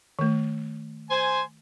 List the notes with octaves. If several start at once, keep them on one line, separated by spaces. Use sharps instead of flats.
D#3 A3
C5 G#5